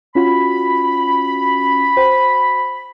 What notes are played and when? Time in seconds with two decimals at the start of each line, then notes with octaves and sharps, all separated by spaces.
0.15 C#4 F4 F#4 B5
1.96 F#4 C5 G5